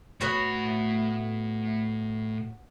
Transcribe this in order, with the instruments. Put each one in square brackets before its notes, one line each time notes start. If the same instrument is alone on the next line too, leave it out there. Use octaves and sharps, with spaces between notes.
[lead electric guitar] A2 B5 [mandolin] B3 F#4 C#5